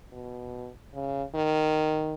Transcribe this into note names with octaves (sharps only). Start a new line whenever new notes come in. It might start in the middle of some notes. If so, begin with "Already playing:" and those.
B2
C#3
D#3